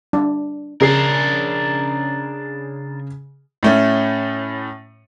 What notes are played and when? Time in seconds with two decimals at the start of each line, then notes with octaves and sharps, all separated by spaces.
0.13 D4
0.81 C#3 D4 G#4 A#4 C7
3.63 A2 A3 C#4